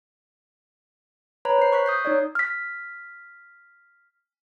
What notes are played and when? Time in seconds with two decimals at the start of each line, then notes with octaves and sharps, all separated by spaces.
1.45 B4 C#5 A#5 B5
1.59 C5 C7
1.72 C#6 F#6 B6
1.86 D#6 G6 C7
2.05 D#4 C#5 D5
2.35 F6 B6